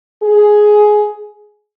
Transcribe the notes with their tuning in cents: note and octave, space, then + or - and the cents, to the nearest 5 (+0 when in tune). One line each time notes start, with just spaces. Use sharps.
G#4 +10